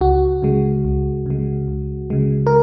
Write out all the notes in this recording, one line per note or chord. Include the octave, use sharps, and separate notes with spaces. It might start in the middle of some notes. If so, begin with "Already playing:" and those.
C#2 F#4
C#3 G#3
C#2
C#3 G#3
C#2
C#3 G#3
A#4